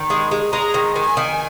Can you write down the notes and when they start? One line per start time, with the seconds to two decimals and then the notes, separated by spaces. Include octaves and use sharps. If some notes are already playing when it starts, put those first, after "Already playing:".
Already playing: D#3
0.10 G#3
0.31 G#3
0.53 G#3 A#5
0.74 D#3
0.96 D#3 G#5
1.17 D#3